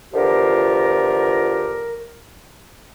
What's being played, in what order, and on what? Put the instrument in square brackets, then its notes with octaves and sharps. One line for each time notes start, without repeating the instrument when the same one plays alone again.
[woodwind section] E2 D3 F3 F4 G4 A#4